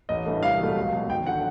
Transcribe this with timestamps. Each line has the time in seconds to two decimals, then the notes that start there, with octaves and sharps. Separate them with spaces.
0.09 A1 D#5
0.26 G2 E3 A3
0.43 C2 F5
0.60 A#2 F#3 A3
0.76 C#2
0.93 B2 F#3
1.10 G#1 G5
1.27 D3 F#3 A3 F#5